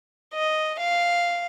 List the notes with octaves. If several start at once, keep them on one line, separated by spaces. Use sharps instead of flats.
D#5
F5